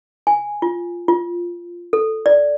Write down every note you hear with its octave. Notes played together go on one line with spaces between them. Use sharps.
G#5
F4
F4
A4
D5